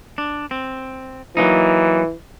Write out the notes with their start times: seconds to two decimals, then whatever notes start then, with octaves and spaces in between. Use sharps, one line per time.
0.18 D4
0.51 C4
1.37 E3 F#3 A#3 D#4